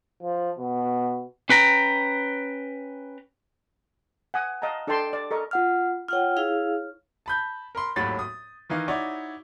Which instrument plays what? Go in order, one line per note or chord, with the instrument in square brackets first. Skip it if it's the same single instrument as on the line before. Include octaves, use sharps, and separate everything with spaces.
[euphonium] F3
B2
[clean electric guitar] C#4 B4 G5 A#5
[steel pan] F#5 G#5 D#6
D#5 F5 A5 A#5
D4 A4 D5 G5 A5 C6
D5
A4 A#4 D#5 C#6
[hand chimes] F4 F#5 F6
[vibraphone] F4 F#5 G5 [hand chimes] C#5 F6
[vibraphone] E4 G#4 F5
[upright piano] A5 B5 G6
A#4 B5 C6
G#1 D#2 A2 F#3 B5 A6
D#6
D#3 E3 D#4 F5
D#4 E4 F#4 C#5 D5